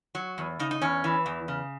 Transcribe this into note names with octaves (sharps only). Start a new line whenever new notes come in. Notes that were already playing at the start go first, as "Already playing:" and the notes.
F#3
E2
C#3 D#4
D#4
E2 C#4
E3
E2
C#3